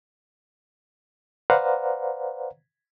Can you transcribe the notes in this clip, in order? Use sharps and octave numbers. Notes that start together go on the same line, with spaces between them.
B4 C5 D5 F5 F#5 A#5